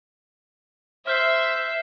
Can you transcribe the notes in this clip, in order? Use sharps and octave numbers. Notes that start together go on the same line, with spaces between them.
C5 E5 F6 G6 C7